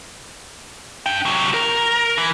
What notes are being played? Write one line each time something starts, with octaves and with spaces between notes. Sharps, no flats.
D4 G5
C3 F#3
A#4
E3